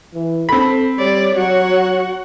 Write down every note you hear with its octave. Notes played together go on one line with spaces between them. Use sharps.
E3
C4 A4 B5
G3 C#5 D5
F#3 F#4 F#5